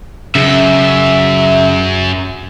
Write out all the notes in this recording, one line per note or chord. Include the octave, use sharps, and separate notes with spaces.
F#2 C#3 E5